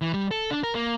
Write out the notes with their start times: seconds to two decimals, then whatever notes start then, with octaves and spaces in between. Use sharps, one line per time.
0.01 E3
0.14 G3
0.31 A4
0.51 D4
0.63 A#4
0.75 A#3